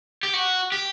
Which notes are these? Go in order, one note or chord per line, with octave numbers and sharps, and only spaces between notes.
G4
F#4
G4